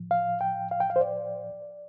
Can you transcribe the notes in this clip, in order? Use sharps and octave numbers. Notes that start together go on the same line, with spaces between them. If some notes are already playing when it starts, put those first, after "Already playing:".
Already playing: A2 F3
F5
G5
F5
G5
F5
C5
D5